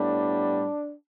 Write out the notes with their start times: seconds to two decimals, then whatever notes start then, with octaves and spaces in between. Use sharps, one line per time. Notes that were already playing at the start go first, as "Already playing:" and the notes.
Already playing: A2 G3 B3 D4